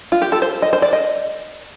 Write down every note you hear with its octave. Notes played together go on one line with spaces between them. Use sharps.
F4
G4
A4
C5
D#5
C5
D5
D#5